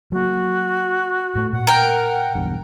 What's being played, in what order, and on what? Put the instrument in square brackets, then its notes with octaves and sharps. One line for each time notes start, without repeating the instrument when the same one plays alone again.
[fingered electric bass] F#3 A#3 [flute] F#4
[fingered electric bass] A2 A3
[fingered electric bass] A#2 [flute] F#5
[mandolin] A#4 G5
[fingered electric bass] B1 E2 G2